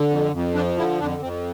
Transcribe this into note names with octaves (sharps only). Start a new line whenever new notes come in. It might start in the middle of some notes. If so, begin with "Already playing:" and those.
Already playing: D3
F2
F2
F3 D4
D3 E4
F2 D4
F2 C4